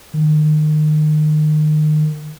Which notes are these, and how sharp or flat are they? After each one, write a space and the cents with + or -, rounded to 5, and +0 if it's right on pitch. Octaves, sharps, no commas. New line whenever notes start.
D#3 -30